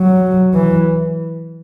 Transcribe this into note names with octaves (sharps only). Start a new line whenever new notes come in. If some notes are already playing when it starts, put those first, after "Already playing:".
Already playing: F#3
E3